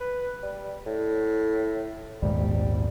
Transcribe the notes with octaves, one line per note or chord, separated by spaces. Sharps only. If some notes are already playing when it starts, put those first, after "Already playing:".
B4
G3
A2
A#1 D#2 G#2 G3